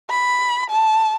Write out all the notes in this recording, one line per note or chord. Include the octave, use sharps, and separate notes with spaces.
B5
A5